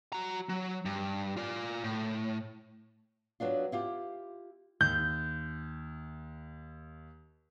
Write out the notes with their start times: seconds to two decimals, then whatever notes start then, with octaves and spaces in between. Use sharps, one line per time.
0.13 F#4 A#5
0.49 F#3
0.85 G2
1.37 F4 D5
1.84 A2
3.40 F#3 B3 D4 F4
3.72 E4 F4 G4
4.81 D#2 G6